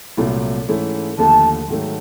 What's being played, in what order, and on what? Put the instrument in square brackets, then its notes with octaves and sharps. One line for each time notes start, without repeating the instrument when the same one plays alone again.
[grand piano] C2 A#2 F#3 A3
G#2 E3 A3 C#4 E4
[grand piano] D#2 D3 F3 A3 [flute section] A5
[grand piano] G#2 D#3 F#3 A3